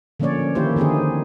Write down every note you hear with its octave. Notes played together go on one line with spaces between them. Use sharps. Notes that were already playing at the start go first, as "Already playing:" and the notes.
D3 F3 A#3 C#4 C#5 D5
D#3 A#3 E4 G4 C5
D3 D#3 C4 D#4 G#4